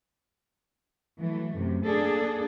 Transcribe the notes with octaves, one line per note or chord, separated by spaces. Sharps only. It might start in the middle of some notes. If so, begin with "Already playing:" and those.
E3 F#3 A3
F#2 C3
A#3 D4 G#4 A4